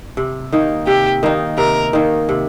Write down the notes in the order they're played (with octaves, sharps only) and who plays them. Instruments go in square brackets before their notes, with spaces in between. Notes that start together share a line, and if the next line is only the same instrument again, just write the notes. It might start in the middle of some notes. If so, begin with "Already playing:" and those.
[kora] C3
D#3 A#3 D#4
[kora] C3 [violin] G4
[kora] D#3 A#3 D#4
[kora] C3 [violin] A#4
[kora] D#3 A#3 D#4
C3